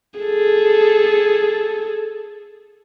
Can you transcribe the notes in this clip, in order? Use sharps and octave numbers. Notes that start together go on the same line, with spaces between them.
G#4 A4